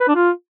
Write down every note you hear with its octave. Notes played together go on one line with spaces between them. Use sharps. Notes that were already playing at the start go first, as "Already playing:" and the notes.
B4
D4
F4